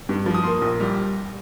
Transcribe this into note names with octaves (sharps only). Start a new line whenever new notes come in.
G2
F3
D#6
A#3 C6
A#1
G3